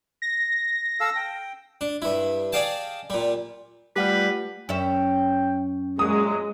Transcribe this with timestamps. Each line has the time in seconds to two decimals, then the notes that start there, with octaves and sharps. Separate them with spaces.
0.22 A#6
1.00 A4 F5 E6
1.16 G5
1.81 D4
2.02 G2 E4
2.53 G#4 D5 D#5 F5 G5 A5
3.10 A#2 G3
3.96 G3 A3 F4 G4 B4 F#5
4.69 F#2 C#4 E5 G5
5.99 A#2 E3 F#3 G#3 D#6